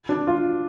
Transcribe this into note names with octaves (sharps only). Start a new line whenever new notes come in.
D4
F4